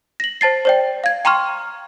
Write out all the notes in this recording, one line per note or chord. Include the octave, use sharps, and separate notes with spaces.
A#6 F#7
C5 A5 A6 C7
C5 D5 G5
F5 G#6
G5 A#5 C6 C#6 F6